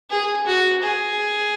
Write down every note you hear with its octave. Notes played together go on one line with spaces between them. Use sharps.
G#4
F#4
G#4